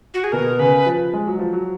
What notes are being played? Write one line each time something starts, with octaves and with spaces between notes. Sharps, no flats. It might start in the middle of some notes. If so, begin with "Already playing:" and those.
F#4
G#4
B2 A#4
C#3 B4
F3
G#3
F#3
F3
F#3